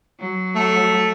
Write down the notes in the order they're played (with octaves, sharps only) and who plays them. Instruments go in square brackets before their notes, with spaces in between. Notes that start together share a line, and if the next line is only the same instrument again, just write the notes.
[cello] F#3
[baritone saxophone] A3